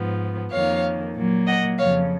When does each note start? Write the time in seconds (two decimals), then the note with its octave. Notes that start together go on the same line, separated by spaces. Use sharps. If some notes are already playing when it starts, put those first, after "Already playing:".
Already playing: G#2 F3 B3
0.51 F2 D#3 A#3 C#5 F5
1.15 A#2 F#3 A#3
1.46 D#5 F#5
1.78 F2 C#3 F3 C#5 F5